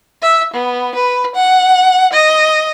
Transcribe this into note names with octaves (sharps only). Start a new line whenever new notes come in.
E5
B3
B4
F#5
D#5